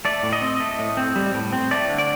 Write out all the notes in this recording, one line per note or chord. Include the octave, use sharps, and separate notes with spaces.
A3 D5
A2
D#5
C4
A3
A2
C4
G3
A2
C4
A3 D5
D3
D5